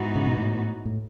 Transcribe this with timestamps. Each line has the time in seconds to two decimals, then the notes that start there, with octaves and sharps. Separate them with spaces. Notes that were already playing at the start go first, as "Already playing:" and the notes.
Already playing: G#2 E3 B3 D#4 F#4
0.16 C#3
0.26 B2
0.37 A2
0.85 A2